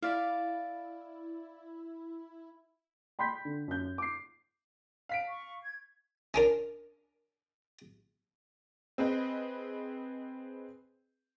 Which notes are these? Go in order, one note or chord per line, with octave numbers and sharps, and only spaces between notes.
E4 D5 F5
G5 B5 C6 G6 B6
D3
F#2 G6
D6 C7
F5 B6 D7
C#6
G#6
C#4 D4 A#4
C4 G#4 B4 D#5